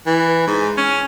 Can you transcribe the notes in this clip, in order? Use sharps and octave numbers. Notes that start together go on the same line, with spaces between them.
E3
G#2
C#4